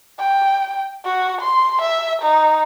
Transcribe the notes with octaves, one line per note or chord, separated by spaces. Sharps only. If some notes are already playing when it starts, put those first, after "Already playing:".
G5
F#4
C6
E5
D#4